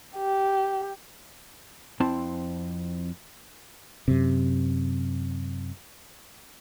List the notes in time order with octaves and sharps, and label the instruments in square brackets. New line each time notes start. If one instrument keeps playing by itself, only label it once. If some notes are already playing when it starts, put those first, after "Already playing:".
[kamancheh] G4
[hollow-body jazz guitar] F2 C4 E4 A5
[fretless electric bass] F#2 C3